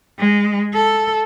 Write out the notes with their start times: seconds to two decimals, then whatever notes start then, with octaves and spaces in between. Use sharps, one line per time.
0.19 G#3
0.73 A4